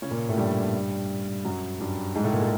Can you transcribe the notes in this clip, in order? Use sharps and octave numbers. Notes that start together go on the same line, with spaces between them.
C#3 C#4
A#2 A#3
A2 A3
G2 G3
F#2 F#3
G2 G3
G#2 G#3
A2 A3
A#2 A#3
G#3